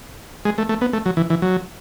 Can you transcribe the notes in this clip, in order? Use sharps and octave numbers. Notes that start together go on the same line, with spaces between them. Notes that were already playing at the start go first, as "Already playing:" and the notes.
G#3
A3
A3
B3
A3
F#3
E3
E3
F#3